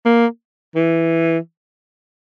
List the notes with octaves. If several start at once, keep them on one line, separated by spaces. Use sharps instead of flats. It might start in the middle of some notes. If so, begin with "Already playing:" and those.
A#3
E3